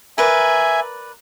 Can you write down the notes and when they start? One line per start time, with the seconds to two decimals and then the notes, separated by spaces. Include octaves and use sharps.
0.18 A#4 B4 D5 E5 G#5